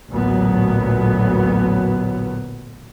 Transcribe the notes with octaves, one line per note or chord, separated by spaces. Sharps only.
A1 D2 A#2 F#3 B3